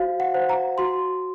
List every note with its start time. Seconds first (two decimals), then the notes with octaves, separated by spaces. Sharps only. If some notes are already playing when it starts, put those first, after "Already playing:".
Already playing: F#4 C5 F5
0.20 F#5
0.34 C5
0.49 A#5
0.78 F#4 C6